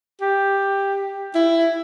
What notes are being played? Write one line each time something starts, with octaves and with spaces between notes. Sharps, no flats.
G4
E4